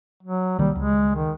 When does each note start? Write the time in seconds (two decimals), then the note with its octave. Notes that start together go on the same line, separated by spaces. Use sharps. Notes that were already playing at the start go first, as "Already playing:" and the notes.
0.23 F#3
0.59 C2 D#3 G3 A#3
0.75 C#2 G#3
1.15 D#3